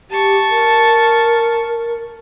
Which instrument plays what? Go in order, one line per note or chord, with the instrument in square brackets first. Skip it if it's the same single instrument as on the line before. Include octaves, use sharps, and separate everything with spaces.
[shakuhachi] G4 [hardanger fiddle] A5 C#6
[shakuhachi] A#4